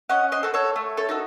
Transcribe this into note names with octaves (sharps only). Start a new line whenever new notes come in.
C#4 D#5 F#5
C5 D#5
F#4 A4
A4 C#5
A3
A4 C#5
D#4 F#4 A4